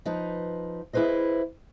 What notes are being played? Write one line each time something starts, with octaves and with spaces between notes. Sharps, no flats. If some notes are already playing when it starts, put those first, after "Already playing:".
F3 D#4 B4
E4 G#4 B4 C5 D#5